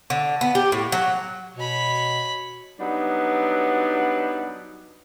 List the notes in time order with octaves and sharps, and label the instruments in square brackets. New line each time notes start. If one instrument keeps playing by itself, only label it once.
[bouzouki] D3
B3
G4
A2
F#3
[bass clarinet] B2 [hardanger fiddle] C#5 B5
[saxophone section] F#3 G3 B3 D4 D#4